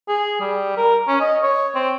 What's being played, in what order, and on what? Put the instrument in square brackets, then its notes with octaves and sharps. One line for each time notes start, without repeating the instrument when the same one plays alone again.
[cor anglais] G#4
G3
A#4
C#4
D#5
C#5
C4